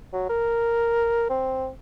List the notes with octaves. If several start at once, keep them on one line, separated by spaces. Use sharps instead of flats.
F#3
A#4
C4